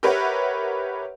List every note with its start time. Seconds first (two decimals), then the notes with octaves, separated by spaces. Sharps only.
0.03 G4 A#4 B4 C#5 E5 F#5